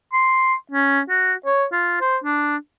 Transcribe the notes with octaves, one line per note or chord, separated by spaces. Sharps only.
C6
C#4
F#4
C#5
F4
C5
D4